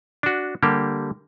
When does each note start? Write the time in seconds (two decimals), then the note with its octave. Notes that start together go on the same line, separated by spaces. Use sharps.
0.23 D4 F#4
0.63 D3 G3 A#3 G4